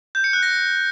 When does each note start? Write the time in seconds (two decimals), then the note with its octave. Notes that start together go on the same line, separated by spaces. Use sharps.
0.15 G6
0.24 C#7
0.33 F#6
0.43 A#6